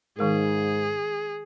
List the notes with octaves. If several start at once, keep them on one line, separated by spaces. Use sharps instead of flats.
G#2 D#3 G#3 G#4 A#4